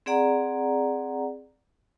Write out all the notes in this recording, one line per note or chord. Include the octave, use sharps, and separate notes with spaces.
C4 G#4 D5 F#5 A#5